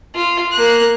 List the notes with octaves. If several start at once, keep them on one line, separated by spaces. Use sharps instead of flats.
F4
A#3 F#6